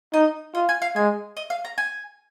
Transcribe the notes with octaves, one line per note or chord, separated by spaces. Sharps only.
D#4 D#5
F4 D#5
G#5
F5
G#3 G#5
D#5
F5
A#5
G#5